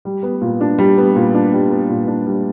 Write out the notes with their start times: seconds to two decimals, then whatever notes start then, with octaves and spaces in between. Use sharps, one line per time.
0.05 G3
0.23 B3
0.41 A#2
0.61 D4
0.79 G3
0.98 B3
1.15 A#2
1.34 D4
1.53 G3
1.70 B3
1.89 A#2
2.08 D4
2.26 G3